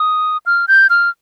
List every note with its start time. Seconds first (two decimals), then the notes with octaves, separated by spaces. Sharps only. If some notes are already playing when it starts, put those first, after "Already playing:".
Already playing: D#6
0.46 F6
0.68 G6
0.90 F6